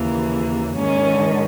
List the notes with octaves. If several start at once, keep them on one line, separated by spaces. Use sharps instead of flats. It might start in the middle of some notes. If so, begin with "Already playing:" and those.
Already playing: D#2 C#3 E3 A#3
G#2 D#3 C#4